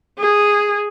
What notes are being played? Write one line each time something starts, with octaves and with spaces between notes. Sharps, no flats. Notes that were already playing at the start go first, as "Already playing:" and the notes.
G#4